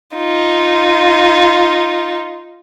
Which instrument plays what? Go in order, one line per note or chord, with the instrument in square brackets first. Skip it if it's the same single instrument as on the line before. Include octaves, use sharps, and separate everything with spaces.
[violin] D#4 F4